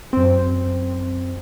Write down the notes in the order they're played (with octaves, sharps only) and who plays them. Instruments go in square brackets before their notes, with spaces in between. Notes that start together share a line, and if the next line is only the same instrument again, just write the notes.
[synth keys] F#2 C4